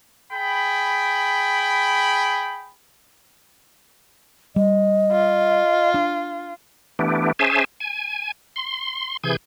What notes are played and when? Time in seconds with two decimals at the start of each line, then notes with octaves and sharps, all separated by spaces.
0.33 G#4 G5 B5
4.56 G3 D#5
5.12 F4
5.94 D4
6.99 E3 A3 B3 D4 G4
7.39 C#4 G#4 C5 E5 G#5 A5
7.80 G#5
8.56 C6
9.24 C3 E3 G#4 G6 G#6